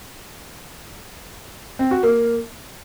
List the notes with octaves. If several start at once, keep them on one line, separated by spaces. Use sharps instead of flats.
C4
F#4
A#3